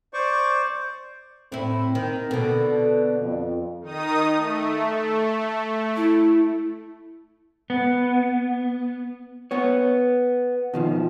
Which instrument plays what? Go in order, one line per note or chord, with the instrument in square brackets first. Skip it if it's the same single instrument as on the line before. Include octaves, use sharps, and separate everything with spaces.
[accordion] C5 D5 C#6
[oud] A2 E4 [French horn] C4
[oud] D#3 [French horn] C4
[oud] B2 D3 [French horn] A4
[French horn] F2
[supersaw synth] D#3 D#4 D#6
A3
[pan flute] E4
[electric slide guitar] B3
[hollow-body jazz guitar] B3 C#5
B2 D#3 F3